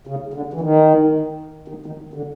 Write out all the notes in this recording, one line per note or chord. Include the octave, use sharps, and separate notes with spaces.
C#3
D3
E3
D#3
D#3
D#3
D3